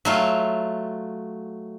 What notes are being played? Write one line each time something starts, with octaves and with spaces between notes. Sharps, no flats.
F#3 A3 F4